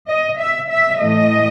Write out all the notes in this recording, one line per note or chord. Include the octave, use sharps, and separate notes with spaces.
D#5
E5
E5
A2 E3 A3 D#5